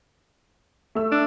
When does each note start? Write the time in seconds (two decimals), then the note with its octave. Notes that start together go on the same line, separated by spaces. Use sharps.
0.95 A3 E6
1.11 D4